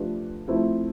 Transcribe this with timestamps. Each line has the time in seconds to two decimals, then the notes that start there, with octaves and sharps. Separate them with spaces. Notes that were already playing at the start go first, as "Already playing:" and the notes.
Already playing: F3 A3 D4 G4 B4
0.48 F3 A3 C4 E4